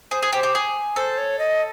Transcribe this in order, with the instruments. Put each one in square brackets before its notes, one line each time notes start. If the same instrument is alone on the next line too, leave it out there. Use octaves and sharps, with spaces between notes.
[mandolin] G#4 [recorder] C5
[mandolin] G#4
[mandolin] G4 [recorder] C5
[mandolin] G4
G#4
[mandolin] A4 [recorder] C5
[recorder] C#5
D#5